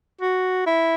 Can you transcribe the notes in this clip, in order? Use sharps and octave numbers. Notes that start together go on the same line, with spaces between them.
F#4
E4